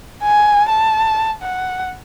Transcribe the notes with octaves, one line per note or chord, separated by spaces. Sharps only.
G#5
A5
F#5